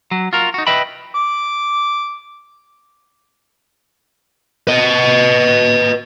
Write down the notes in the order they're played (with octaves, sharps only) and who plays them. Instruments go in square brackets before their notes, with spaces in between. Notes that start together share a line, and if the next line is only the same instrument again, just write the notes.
[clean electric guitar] F#3
F4 F#4 A#4
D#4 F#4
B4 D#5 E5 G5 B5
[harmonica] D6
[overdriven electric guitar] B4 D#5